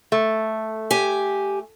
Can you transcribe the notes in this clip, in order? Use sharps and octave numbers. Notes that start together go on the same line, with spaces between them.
A3
G4 G#5